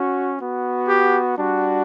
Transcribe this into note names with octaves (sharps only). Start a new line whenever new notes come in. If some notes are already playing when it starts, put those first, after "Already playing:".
Already playing: C#4 F#4
B3 F#4
G4
G3 D4 F#4